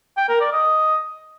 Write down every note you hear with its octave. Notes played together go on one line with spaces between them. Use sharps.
G5
A#4
D5
D#5